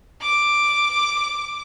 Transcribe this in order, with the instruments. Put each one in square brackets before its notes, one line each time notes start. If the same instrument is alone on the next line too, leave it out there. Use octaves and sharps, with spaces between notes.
[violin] D6